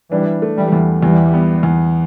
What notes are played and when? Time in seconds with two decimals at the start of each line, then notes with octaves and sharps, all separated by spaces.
0.11 E3 G3 D4
0.42 A3
0.57 E3 G3
0.72 E2
1.03 E2 E3 G3
1.34 B3
1.63 E2